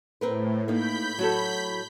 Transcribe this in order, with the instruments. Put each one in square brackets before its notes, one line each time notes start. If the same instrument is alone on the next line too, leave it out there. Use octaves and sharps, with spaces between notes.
[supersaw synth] A2 [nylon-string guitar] C4 A#4 B4
[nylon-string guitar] A#3 D#4 [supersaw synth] B5 G6 B6
[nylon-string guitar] F#3 F#4 A4